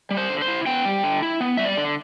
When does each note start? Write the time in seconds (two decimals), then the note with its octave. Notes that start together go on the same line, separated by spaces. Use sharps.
0.11 G3
0.17 C5
0.30 D3
0.42 C5
0.48 E4
0.66 B3 G5
0.85 G3
1.03 D3
1.22 E4
1.41 B3
1.57 G3 E5
1.65 D5
1.77 D3